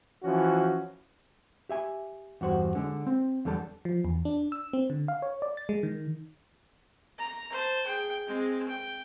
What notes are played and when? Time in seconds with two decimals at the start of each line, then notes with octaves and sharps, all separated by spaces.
0.23 E3 F3 C#4 F#4
1.69 G4 E5 G#5
2.41 E2 G2 F#4 C5
2.75 D3 G#3 D4
3.07 C4
3.45 E2 D3 G3 A4 A5
3.85 F3
4.05 E2
4.25 D4
4.52 E6
4.73 C4
4.90 D3
5.08 F5
5.22 C#5
5.42 D5
5.57 A6
5.69 G#3
5.83 D#3
7.18 A#5
7.52 C5 A5
7.86 G#4 G5
8.27 G#3 C4
8.69 G5